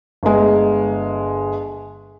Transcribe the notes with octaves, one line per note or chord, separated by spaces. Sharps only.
G1 G#3